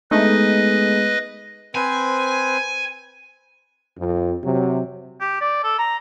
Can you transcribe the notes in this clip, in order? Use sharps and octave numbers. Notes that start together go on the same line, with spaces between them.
G#3 A3 B3 D#4 G#4 B4 D#5
C4 B4 C5 G#5
F2
C3 F#3
G4
D5
A4
A#5